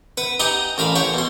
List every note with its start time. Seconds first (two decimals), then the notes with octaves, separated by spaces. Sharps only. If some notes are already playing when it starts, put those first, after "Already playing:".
0.17 B4 F#5
0.40 D#4 G4 F#5 G#5 A#5
0.78 A1 A#4 F5 B5
0.96 C#5 F#5 G5 C6 C#6
1.14 B2 C6